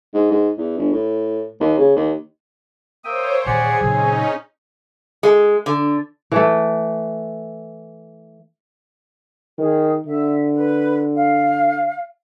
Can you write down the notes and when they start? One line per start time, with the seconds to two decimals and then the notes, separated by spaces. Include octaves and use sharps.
0.14 G#2
0.31 G#2
0.58 E2
0.78 G1
0.92 A2
1.60 D#2
1.78 C#3
1.96 D#2
3.05 A#3 C5 C#5 E5 G5 D#6
3.46 A#2 D#3 E3 G4 G#4 D5 F#5 G#5
3.81 A#2 C#3 F#3 C4 C#4 D#4
5.23 G#3
5.66 D3
6.32 E3 A3
9.58 D#3 G#4
10.07 D3 E5
10.55 B4
11.15 F5